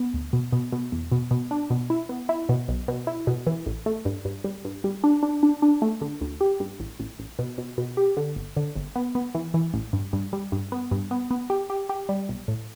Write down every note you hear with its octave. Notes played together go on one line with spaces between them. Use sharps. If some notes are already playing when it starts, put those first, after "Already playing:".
Already playing: B3
D2
B2
B2
B2
E2
B2
B2
D4
B2
E4
B3
E4
B2
B1
B2
E4
B2
E3
A1
A3
G2
G2
G3
G2
G3
D4
D4
D4
D4
A3
D3
D2
G4
G2
A1
A1
A1
B2
B2
B2
G4
D3
G1
D3
G1
B3
B3
E3
E3
A1
G2
G2
G3
G2
B3
G2
B3
B3
G4
G4
G4
G3
B1
A2